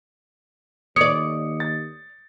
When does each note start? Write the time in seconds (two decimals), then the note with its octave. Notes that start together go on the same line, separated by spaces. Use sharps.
0.96 D#2 C#5 D5 D#6 C#7
1.60 A6